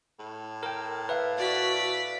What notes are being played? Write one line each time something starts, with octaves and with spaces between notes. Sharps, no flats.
A2
A#4 G5
B4 E5 F5
F#4 D5 B6